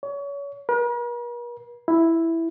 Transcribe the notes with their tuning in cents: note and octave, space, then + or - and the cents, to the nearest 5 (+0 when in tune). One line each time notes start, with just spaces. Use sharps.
C#5 +30
A#4 +45
E4 +0